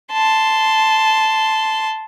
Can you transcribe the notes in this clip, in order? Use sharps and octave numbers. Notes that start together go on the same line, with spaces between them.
A5 C6